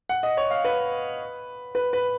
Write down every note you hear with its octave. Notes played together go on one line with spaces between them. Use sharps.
F#5
D#5
C#5
F5
B4
B4
B4